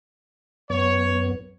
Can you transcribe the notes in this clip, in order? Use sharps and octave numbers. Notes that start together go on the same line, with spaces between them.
F#2 B3 C#5